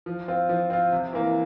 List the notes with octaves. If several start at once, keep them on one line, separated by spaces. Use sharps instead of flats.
F3
C4 F4
F3
C4 F4
C3
E3 A#3